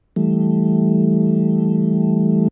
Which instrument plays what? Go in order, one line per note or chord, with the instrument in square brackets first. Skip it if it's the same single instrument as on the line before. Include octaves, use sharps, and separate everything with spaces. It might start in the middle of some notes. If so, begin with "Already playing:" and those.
[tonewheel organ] E3 G3 A3